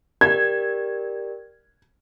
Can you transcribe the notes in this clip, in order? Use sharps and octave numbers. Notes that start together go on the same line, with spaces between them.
G4 A#4 D5 G#6